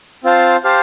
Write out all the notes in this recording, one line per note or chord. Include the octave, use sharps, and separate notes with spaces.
C4 F4 C5 F5 A5
G4 C5 F5 A5